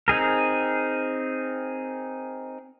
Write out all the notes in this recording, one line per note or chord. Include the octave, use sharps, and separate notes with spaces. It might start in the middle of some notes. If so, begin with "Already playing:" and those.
C4 D#4 G#4 A#4